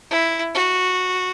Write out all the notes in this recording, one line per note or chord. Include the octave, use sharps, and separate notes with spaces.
E4
F#4